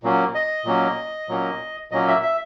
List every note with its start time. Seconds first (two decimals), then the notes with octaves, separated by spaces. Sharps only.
0.03 A#2 F#3 A#3 C#4
0.35 D#5
0.65 A#2 F#3 A#3 C#4
1.29 A#2 F#3 A#3 C#4
1.92 A#2 F#3 A#3 C#4 D#5
2.08 E5
2.23 E5